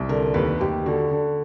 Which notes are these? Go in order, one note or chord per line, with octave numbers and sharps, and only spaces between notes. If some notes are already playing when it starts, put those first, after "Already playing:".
Already playing: C2
D3 A#4
D#2 B4
D#2 G4
D3 F#4
D3